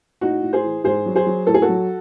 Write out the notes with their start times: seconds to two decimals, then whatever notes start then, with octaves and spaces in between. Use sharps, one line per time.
0.21 A2 D#4 F#4
0.42 A2
0.53 G#4 C5
0.64 E3
0.84 G#2 G#4 C5
1.06 F#3
1.15 G#4 C5
1.27 F#3
1.47 A2 A4
1.54 G#4
1.62 F#4 A4
1.69 F#3